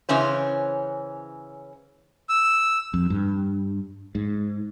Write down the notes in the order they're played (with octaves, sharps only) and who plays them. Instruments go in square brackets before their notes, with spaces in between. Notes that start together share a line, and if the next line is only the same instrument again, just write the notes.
[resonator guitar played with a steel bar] C#3 E3 C#4 C5
[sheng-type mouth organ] E6
[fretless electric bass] F2
G2
G#2